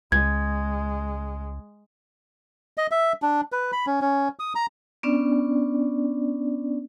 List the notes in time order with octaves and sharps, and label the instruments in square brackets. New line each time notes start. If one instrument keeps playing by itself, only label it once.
[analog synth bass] C#2 [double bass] G#3 [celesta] G#6
[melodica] D#5
E5
D4
B4
B5
C#4
C#4
D#6
A#5
[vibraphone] B3 C#4 D4 D5